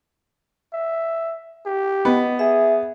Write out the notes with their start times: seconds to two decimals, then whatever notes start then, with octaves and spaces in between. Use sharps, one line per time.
0.73 E5
1.66 G4
2.05 B3 D#5
2.39 G#4 E5